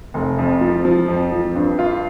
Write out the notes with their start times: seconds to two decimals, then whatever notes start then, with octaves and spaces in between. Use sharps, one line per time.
0.14 F1
0.38 F2
0.61 F3
0.85 F3
1.08 F2
1.32 F3
1.55 G2
1.79 F4